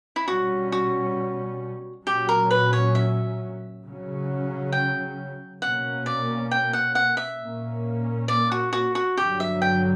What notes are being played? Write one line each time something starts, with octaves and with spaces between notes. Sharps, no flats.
E4
B2 G3 C#4 F#4
F#4
A#2 F#3 C#4 G4
A#4
B4
C#5
E5
C#3 F#3 C#4
G5
B2 A#3 C#4 F#5
D5
G5
F#5
F#5
E5
A#2 A#3 C#4
D5
F#4
F#4
F#4
G2 D3 F#3 G4
E5
G5